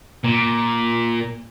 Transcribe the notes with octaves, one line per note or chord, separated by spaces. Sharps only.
A#2